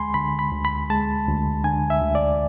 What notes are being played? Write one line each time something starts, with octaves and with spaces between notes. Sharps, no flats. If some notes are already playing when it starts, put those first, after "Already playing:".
Already playing: D2 G#3 G#5 B5 C6
D3 B5
B5
D2
B5
G#3 A5
D2
D3 G#5
E5
D2
D5